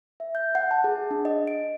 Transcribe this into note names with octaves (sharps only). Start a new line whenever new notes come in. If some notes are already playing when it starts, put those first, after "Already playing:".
E5
G6
F#5
A5
G#4
D4
D#5
D7